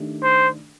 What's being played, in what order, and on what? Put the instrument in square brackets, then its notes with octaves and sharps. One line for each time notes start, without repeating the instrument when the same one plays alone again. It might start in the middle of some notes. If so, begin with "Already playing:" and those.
Already playing: [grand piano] D#3 A3 D4 G4
[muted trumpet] C5